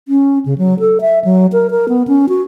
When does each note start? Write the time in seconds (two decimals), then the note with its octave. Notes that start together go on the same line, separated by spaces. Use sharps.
0.08 C#4
0.46 C#3
0.58 F#3
0.80 A4
1.01 E5
1.24 F#3
1.53 A#4
1.71 A#4
1.89 B3
2.08 C#4
2.29 F#4